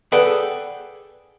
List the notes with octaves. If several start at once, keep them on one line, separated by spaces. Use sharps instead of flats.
G#4 A4 B4 D5 F#5 G5